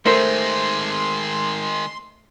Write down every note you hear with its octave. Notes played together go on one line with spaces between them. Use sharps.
D#3 G#3 A3 A#4 C5 C6